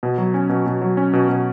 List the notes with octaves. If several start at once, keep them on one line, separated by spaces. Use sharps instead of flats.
B2
F#3
C#4
B2
B2
F#3
C#4
B2
B2